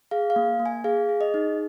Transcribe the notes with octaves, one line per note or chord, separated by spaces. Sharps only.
G#4 F5
F5
A#3
A#3
G#5
G#4 F5
G#4
D#5
D#4